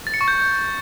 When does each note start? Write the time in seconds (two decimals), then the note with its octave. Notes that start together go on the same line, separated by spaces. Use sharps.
0.07 A6
0.14 C#7
0.21 C#6
0.28 G6